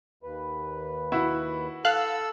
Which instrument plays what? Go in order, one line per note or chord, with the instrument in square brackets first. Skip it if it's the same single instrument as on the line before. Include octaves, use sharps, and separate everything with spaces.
[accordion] D#2 B4
[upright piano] E4 F#4
[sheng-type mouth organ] A4 E6 [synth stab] F5 F#6